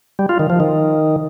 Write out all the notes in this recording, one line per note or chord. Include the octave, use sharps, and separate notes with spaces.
G3
F4
D#3
F3
D#3